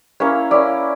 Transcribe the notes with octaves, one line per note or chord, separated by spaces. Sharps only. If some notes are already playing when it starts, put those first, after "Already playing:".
A#3 C#4 E4 C#5
A#3 C#4 E4 D5